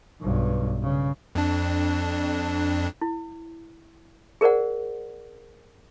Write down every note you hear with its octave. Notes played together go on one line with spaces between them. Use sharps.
B1 G2
C#3
F2 D4
E4
G#4 A#4 C5 D5 F#5